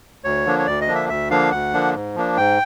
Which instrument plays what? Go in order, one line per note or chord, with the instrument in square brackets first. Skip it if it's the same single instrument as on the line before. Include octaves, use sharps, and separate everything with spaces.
[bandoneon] D2 C#5
D3 F3 A#3 D4
C#5
D2 D5
D#5
D3 F3 A#3 D4
E5
D2 E5
D3 F3 A#3 D4 F5
D2 F#5
D3 F3 A#3 D4
G#2
F3 A#3 D4
G#2 G5